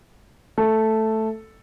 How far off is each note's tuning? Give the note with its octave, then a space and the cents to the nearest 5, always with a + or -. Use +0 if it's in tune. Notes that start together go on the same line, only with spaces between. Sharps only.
A3 +0 A4 +0